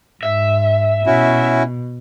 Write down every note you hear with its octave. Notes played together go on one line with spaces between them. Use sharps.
G#2 E5
B2 C#4 E4 F#4